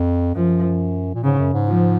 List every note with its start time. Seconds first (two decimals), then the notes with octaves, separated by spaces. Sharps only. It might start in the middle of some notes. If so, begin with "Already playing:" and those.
Already playing: F2
0.35 F#2 F3
1.15 A#2
1.23 G#2 C#3
1.38 F#2
1.53 G#2
1.68 F3